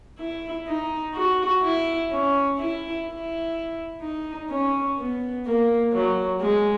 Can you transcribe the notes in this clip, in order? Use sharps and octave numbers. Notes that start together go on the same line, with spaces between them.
E4
D#4
F#4
E4
C#4
E4
E4
D#4
C#4
B3
A#3
F#3
G#3